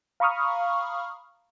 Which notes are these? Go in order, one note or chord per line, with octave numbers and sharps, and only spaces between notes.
F5 A#5 B5 C#6 D#6 F6